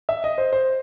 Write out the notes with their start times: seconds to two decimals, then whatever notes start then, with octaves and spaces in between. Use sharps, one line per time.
0.09 E5
0.24 D#5
0.38 C5
0.52 C5